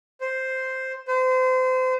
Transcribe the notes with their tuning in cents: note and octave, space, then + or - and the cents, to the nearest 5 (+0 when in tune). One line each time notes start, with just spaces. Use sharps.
C5 +0
C5 -30